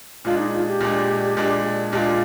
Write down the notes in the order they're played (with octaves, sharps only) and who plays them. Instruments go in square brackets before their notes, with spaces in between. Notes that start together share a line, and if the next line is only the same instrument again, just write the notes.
[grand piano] A#2 G#3 D4 [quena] F4
[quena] D#4
F4
G4
[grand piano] A#2 G#3 D4
A#2 G#3 D4
[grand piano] A#2 G#3 D4 [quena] F4 G4